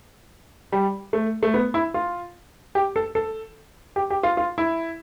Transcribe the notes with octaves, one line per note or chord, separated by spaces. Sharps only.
G3
A3
A3
B3
E4
F4
G4
A4
A4
G4
G4
F4
F4
E4